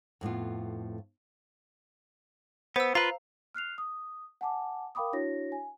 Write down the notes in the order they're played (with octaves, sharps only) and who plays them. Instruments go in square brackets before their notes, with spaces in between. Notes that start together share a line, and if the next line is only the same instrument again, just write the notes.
[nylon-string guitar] F2 A2 B3 F4
[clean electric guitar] B3 [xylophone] C5 E6
[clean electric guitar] F4 B4 [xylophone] F5 A#5
[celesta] F6 F#6 C7 F7
D#6
F#5 G#5 A5 D6
A#4 F5 G5 B5 D6 D#6
D4 E4 F#4 C#5 A#6
G#5